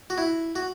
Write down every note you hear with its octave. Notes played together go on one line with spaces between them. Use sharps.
F#4
E4
F#4